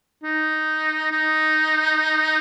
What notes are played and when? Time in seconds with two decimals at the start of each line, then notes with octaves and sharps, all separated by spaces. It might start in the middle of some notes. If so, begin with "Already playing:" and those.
0.23 D#4
1.11 D#4